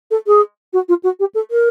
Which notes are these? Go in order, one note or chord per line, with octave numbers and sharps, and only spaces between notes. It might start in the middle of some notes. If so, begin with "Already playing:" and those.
A4
G#4
F#4
F4
F#4
G4
A4
A#4